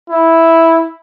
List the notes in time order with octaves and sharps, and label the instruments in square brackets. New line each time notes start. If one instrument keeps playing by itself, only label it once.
[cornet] E4